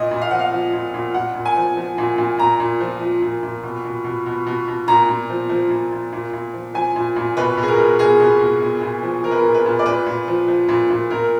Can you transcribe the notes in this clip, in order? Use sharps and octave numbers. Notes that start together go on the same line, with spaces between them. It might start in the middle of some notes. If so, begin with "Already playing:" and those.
Already playing: A#2 D#5
A#2
F5
F3 F#5
F5
F3
A#2
A#2
A#2 F#5
A#2
G#5
F3
F3
A#2
A#2
A#2 A#5
A#2
F3
F3
A#2
A#2
B2
B2
B2
B2
B2
B2
A#2 A#5
A#2
F3
F3
A#2
A#2
A#2
A#2
F3
F3 G#5
A#2
A#2
B2 B4
B2
G#4
A#4
B2
B2 G#4
B2
B2
A#2
A#2
F3
F3 A#4
B4
A#4
A#2
B4
A#2
D5
A#2 B4
A#2
F3
F3
A#2
A#2
A#2 A#4